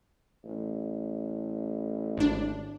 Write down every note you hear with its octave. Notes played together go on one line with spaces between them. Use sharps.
A1
G#1 D4